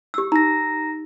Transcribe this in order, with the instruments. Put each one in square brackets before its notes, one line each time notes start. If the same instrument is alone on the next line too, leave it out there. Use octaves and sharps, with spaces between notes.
[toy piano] G4 E6
[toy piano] D#4 [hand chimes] A#5 A#6